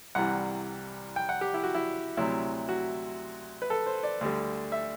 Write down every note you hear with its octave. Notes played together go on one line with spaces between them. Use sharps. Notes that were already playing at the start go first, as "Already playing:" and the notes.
C2 C3 E3 G3 F#5
G5
F#5
G4
E4
F#4
E4
D2 C3 F#3 E4
F#4
B4
A4
C5
D5
D2 D3 G3
E5